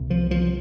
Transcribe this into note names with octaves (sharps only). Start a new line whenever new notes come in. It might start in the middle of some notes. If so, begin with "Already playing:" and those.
Already playing: C2 C3
F3
F3